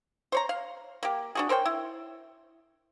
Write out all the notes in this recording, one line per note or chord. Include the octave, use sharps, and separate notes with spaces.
C5 C#5 A#5
F5
A#3 G4
D4 F#4 G#4
A#4 C5 C#5 G5
E4